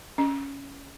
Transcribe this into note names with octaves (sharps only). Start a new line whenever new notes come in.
C#4